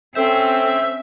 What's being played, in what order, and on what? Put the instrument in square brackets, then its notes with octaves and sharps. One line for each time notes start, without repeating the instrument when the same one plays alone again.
[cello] C4 C#4 [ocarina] A4 [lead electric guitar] C5 G5 [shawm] E5